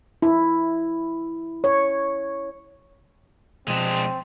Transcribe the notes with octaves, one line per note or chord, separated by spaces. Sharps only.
E4
C#5
B2 F3 G#3 C4 D4